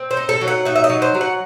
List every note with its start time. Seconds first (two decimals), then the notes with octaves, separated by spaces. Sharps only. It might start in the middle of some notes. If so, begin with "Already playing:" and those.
Already playing: C4
0.11 C5
0.17 D#4
0.29 A4
0.41 F#3
0.48 F#5
0.65 D#4 E5
0.76 E5
0.84 D#5
0.90 F#3
1.02 C5
1.15 F#3
1.21 F#5